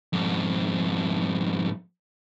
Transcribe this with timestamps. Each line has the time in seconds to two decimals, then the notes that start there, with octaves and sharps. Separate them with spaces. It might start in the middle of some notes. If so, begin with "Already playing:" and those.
0.13 F2 G#2